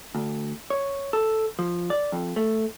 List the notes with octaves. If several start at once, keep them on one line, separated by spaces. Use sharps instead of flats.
D2
C#5
A4
F3
D5
F2
A3